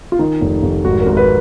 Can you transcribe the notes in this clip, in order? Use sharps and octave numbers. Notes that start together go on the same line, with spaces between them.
F4
D#3 D#4
F1
F1
G#1 F#4
A#4
G#1
B4